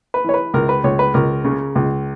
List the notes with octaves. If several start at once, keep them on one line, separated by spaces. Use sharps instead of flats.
B4
E3 C#5
B4
C#2 A#4
B4
C#2 C#5
B4
C#2 A#4
C#3
C#2